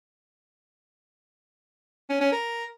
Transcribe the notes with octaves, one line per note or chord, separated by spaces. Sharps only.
C#4
C#4
A#4